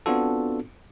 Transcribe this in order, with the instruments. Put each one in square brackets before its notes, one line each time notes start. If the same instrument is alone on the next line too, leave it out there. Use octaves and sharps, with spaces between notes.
[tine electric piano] B3 C4 D4 F4 F#4 A4